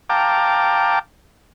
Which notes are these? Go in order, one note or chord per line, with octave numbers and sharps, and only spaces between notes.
F5 G5 A5 A#5 D6